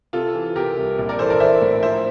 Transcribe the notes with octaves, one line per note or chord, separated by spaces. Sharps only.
C3 F4 A4
E3
C3 G4 A#4
C2
A#1
A#4 D5
E3 A4 C5
A#4 D5
E3 C5 E5
A2
F3 C5 E5